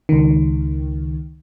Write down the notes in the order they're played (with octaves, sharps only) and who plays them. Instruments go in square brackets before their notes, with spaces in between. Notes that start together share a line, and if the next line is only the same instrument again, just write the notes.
[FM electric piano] C#2 D#3